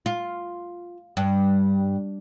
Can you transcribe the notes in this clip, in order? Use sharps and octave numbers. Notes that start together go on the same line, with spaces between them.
F4
G2